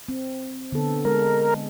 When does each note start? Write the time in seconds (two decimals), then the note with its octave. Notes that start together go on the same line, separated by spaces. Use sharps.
0.09 C4
0.72 D3 B3 A4
1.05 G#3 A#4